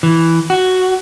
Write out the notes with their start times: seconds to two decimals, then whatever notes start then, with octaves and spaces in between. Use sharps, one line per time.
0.03 E3
0.50 F#4